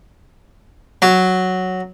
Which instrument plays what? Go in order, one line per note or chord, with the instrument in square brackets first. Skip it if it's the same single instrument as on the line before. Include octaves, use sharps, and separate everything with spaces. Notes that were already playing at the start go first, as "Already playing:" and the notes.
[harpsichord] F#3